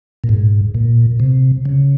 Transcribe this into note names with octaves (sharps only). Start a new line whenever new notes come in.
A#2
G#2
A#2
C3
C#3